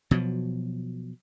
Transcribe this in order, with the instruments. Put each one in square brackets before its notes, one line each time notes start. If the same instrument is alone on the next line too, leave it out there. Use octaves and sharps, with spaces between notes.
[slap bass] B2 F3 F#3